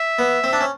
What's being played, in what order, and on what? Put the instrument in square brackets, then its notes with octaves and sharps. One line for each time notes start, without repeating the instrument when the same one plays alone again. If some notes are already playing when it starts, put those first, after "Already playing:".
Already playing: [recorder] E5
[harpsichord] B3
C4
D4
C#4